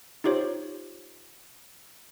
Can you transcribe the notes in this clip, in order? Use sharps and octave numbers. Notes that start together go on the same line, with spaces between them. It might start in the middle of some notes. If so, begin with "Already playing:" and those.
D#4 F4 G4 C5 C#5